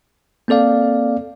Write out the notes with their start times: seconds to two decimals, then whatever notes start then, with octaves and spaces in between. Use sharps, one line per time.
0.48 A#3 C4 A4 D5 F5